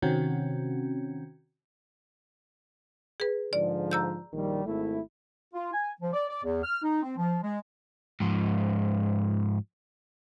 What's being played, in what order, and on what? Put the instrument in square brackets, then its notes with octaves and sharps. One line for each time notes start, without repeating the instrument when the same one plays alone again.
[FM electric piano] C3 D#3 C4 C#4 F#4
[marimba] G#4 B4
[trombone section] G#2 D3 F3 [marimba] D5
[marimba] A#5 E6 G6
[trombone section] A#1 D#3 G3
G#1 A3 E4
[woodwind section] F4
G#5
F3
D5
D5
E2
F6
D#4
C4
F3
G#3
[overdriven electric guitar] G#2 F3